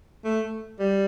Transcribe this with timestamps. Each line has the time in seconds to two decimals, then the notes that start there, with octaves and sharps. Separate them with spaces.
0.24 A3
0.79 G3